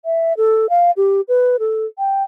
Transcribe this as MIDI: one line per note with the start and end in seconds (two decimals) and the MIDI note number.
0.05 0.33 76
0.37 0.66 69
0.70 0.91 77
0.97 1.21 67
1.28 1.56 71
1.59 1.86 69
1.98 2.23 79